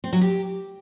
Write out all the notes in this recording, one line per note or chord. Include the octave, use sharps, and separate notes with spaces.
C4
F#3
G4